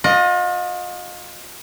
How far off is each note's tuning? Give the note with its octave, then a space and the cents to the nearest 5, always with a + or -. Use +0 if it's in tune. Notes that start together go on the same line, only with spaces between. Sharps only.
F4 +40 D#5 +0